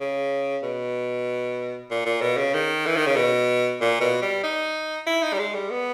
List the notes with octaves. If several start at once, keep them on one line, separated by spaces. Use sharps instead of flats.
C#3
B2
A#2
A#2
B2
C#3
D#3
E3
D#3
C#3
B2
A#2
B2
G3
D#4
E4
D#4
G3
G#3
G3
B3